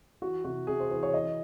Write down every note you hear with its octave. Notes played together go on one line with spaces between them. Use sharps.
E3 F#4
C3 F#4
C3 G#4
C5
E3 C5
C#5
E3 D#5